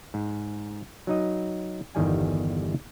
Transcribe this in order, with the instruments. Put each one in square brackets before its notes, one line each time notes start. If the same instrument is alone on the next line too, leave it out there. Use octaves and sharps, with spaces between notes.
[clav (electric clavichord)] G#2
F#3 D#4 D#5
G1 E2 D#3 G3 G#5